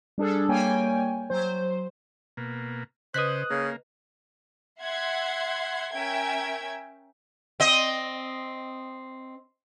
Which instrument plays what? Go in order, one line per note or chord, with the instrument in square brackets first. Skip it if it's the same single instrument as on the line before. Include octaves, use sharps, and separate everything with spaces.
[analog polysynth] G3 D4 G#4 A4
G3 A#3 C#5 G5 G#5
F#3 C5
[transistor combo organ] B2 A#3
[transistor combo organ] C#3 [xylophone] B4 D#5 B6 [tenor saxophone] C5 [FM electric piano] D#6 F#6
[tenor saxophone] C#3 [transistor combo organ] A#3
[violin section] E5 F#5 C6 G#6
C#4 A#4 E5 G5 G#6
[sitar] C4 D#5